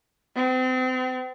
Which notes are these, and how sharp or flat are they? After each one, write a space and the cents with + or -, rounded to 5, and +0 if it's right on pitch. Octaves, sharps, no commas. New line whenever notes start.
C4 -35